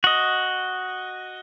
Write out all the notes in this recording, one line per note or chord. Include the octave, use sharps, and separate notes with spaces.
F#4 D#5